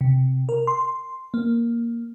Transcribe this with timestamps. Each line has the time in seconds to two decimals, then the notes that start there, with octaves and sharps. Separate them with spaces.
0.01 C3
0.49 A#4
0.67 C6
1.34 A#3